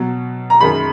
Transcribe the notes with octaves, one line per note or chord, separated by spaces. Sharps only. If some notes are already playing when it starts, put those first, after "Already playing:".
Already playing: B2 F#3
A#5
F#2 D#3 G#3 B5